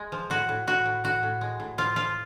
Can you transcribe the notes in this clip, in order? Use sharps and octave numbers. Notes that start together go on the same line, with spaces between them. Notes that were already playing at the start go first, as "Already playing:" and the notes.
Already playing: G#3
F3
A2 F#4
A2
A2 F#4
A2
A2 F#4
A2
G#3
A2
F3 F4
F3 F4